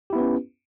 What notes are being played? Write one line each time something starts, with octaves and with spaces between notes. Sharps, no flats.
B3 C#4 E4 G4 B4